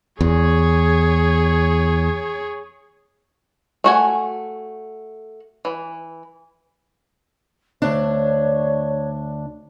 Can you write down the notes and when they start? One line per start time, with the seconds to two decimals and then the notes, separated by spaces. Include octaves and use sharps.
0.21 E2 G#4 C#5
3.84 A3 F#4 G#5
5.65 E3
7.82 D2 D4 C#5